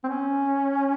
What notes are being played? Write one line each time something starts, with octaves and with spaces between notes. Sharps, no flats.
C4
C#4